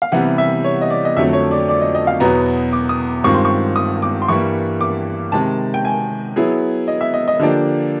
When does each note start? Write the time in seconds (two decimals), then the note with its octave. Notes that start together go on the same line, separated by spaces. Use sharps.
0.02 F5
0.12 C3 E3 G3 B3 F#5
0.38 E5
0.64 C#5
0.82 D#5
0.90 D5
1.05 D#5
1.17 F2 D3 F#3 A3 E5
1.33 C#5
1.51 D5
1.69 D5
1.81 D#5
1.95 D#5
2.07 F5
2.20 E2 B2 F#3 B3 A#5
2.73 D6
2.89 D#6
3.24 G2 D#3 G#3 C4 F4 C#6
3.34 C6
3.45 C#6
3.76 D#6
4.02 D6
4.22 C6
4.28 G2 E3 G3 A#3 C#6
4.81 D6
5.32 C3 D#3 G#3 A5
5.74 G5
5.85 G#5
6.36 F#3 B3 E4 G#4
6.88 D#5
7.01 E5
7.14 D#5
7.28 D#5
7.39 D3 F3 A#3 D4 G4